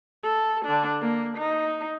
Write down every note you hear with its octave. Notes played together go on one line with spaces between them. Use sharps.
A4
D3 D4
A#3
D#4